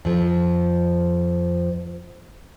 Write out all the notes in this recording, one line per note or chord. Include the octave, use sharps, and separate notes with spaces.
F2 F3